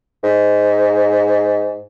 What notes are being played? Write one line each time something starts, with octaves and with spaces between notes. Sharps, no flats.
G#2